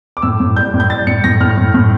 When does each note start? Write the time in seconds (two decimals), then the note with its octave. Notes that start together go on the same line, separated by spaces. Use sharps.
0.17 D6
0.22 A2 E6
0.40 A2
0.56 G3 G6
0.74 A2
0.80 G6
0.90 G3 A6
1.07 A2 C#7
1.24 A2 A#6
1.40 A2 F6
1.57 A2
1.74 A2